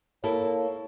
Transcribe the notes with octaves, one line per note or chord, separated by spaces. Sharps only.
A#3 E4 A4 C#5